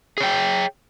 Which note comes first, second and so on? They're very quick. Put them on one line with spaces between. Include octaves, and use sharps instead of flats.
G#4 C#5 G5